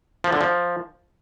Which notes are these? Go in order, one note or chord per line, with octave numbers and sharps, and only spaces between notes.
F3
D3
F3